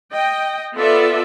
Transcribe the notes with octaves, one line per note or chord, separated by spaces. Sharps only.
D#5 G5
B3 F4 A4 D5 E5